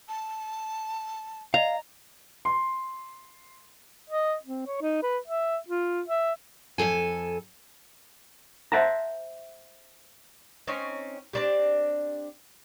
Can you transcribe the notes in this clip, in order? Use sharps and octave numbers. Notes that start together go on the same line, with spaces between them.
A5
D5 D#5 F5 A#5
C6
D#5
C4
C#5
D#4
B4
E5
F4
E5
F2 C#3 A4 G#5
C5 E5 F#5 A5 A#5
C4 C#4 D#4
C4 D4 G4